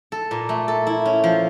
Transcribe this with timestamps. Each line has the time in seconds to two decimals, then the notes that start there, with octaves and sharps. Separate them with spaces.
0.12 A4
0.31 A#2
0.49 A3
0.68 A4
0.87 E4
1.05 C#4
1.24 F3